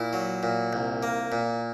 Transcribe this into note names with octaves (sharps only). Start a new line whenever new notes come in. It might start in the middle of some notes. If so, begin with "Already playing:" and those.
Already playing: A#2 E4
F#3
A#2
C2
A#3
A#2